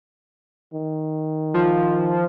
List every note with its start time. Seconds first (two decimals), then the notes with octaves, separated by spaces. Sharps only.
0.74 D#3
1.54 F3